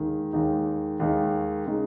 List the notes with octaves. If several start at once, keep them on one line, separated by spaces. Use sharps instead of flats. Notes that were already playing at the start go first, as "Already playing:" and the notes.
Already playing: D#2 D#3 G#3 D#4
D#2 D#3 G#3 D#4
D#2 D#3 G#3 D#4
C#3 G#3 D#4